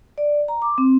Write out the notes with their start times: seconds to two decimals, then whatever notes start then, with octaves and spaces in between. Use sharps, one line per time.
0.18 D5
0.48 A#5
0.62 D6
0.78 C4